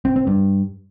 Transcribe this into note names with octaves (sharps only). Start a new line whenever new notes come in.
C4
C4
G2